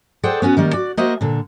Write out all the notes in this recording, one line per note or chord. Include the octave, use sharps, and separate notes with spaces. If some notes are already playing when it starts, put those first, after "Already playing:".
G#4 A4 C5 D5 F#5 G5
B3 C#4 F#4 B4
D#3 G3 A#3
F#4 D5
A#3 F#4 C5 D#5 E5 F#5
A#2 D3